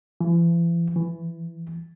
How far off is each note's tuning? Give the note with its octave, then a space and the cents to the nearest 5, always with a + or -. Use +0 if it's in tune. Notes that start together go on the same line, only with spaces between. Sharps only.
E3 +40
E3 +10